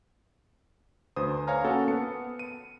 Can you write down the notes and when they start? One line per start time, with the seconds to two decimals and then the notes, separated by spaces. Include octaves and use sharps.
1.16 D2 B4 C5 D#6
1.47 C5 C#5 F5 G#5 A#5 F6
1.64 A#3 C#4 F#4 A4 F#5 G#5
1.88 B3 A5 C#7
2.39 D#7